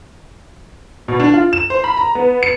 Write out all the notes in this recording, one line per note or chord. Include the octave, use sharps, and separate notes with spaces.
B2
D4
F4
E7
C5
B5
A#5
B3
C#7